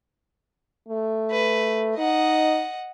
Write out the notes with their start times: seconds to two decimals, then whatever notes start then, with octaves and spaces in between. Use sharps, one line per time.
0.88 A3
1.32 B4
1.98 D#4 D#5 F#5